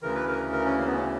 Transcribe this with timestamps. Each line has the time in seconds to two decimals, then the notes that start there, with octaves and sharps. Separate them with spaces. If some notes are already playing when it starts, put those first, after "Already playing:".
0.02 D2 C#3 E3 A#4
0.14 B4
0.28 A#4
0.52 A#4
0.65 C#4
0.78 A#3
0.87 B3
0.96 C#4